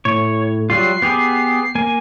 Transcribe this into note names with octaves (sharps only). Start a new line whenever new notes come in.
A2 C#5
F#3 G3 F4 C7
B3 G4 G#4
A#3 G#5